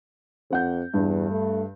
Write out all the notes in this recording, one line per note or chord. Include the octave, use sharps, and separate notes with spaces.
F2 C4 F#5 G6
E2 G2
A3